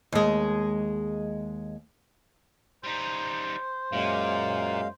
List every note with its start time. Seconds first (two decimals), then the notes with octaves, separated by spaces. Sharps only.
0.12 D#2 G#3
2.84 G3 D#4 C5
3.93 F#2 A#2 G#3 F5